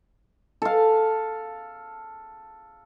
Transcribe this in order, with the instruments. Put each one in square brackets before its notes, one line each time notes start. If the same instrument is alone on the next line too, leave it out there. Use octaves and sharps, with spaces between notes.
[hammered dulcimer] A4 F5